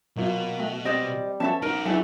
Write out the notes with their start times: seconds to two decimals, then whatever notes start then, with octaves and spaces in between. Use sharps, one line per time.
0.17 B2 F#3 A#3 F4
0.59 A3
0.85 G3 C4 C5 D5 D#5
1.40 F3 B3 C#4 A4 E5 A5
1.62 D#4 F#4 A#4
1.85 C#2 F#3 D4 E4 A4 E5 G#5